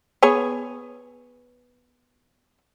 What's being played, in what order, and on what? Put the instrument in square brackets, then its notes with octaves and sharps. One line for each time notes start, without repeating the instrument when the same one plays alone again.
[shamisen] B3 G#4 C#5